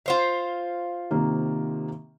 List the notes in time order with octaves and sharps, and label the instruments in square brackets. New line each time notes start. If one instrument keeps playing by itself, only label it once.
[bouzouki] F4 C5 F5
[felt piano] C3 D#3 A#3